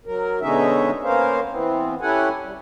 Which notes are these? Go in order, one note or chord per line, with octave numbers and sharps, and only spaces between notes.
F#3 A#4
B2 D3 G#3 C#4 D#4 E5
A#3 B3 C#4 A#4 C5 F5
E3 B3 C4
C#4 E4 G4 A4 F#5 G#5
G3